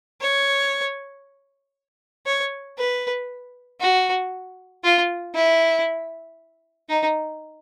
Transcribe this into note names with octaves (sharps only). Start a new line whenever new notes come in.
C#5
C#5
B4
F#4
F4
E4
D#4